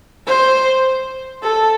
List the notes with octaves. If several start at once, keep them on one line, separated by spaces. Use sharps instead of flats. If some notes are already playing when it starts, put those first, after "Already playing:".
C5
A4